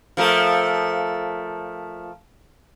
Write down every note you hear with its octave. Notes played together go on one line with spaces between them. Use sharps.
F3 A3 A#4